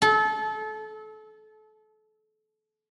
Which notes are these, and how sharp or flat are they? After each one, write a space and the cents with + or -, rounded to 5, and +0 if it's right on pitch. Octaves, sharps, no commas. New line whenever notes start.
A4 -30